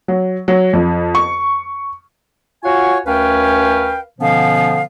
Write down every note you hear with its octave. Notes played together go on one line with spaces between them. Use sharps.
F#3
F#3
F2
C#6
F4 F#4 C#5 F#5 G#5 C#6
D2 C#4 A#4 B4 F5 G5
B2 D3 F3 B3 C#4 F5